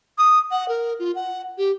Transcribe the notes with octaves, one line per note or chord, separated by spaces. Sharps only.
D#6
F#5
A#4
F4
F#5
G4